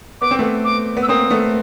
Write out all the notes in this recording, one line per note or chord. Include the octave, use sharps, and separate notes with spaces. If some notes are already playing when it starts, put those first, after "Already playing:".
B3 D6
C4
A3 B3
D6
B3
E6
A#3 C4 D#6
A3 B3